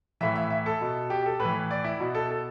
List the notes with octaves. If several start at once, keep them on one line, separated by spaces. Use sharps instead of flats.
A2 E3 E5
E5
E5
A4
B2
G4
A4
A2 B4
E3
D5
E4
B2 F#4
A4
A4